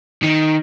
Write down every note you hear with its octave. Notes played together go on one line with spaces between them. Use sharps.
D#3